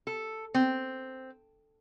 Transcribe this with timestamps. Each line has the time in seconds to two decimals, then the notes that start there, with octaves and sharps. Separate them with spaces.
0.07 A4
0.54 C4